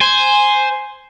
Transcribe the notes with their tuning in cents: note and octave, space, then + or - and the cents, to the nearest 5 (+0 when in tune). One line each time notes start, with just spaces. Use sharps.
C5 +0 G#5 +0